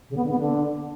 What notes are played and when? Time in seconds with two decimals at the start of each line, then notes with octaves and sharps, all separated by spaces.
0.09 C#3
0.16 B3
0.23 D3
0.31 B3
0.38 D3